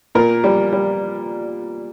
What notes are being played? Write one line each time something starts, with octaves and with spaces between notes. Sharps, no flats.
A#2 A#4
G3
G3